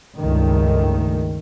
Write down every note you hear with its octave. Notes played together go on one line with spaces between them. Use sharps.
C#2 G2 D#3 A3